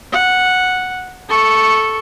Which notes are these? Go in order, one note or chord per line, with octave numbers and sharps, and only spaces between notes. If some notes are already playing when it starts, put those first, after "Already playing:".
F#5
A4 C#6